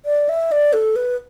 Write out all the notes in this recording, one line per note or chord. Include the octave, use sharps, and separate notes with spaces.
D5
E5
D5
A4
B4